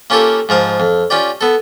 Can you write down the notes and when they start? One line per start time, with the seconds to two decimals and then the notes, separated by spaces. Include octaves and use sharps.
0.10 A#3 C#4 F4 G4 A4 A#4
0.49 G#2 F3 A#4 F5
0.80 F2
1.10 C#4 F4 G4 D5
1.41 B3 A4